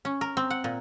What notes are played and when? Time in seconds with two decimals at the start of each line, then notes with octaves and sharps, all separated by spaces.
0.05 C#4
0.21 A#4
0.37 C4
0.50 F#5
0.64 A#2